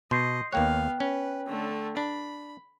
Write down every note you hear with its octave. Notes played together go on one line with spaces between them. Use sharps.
B2 D#5 C6 G6 C7
D#2 A#3 B3 C#5 F5 G5 F#6
C#4 B4
D3 A3
D4 B5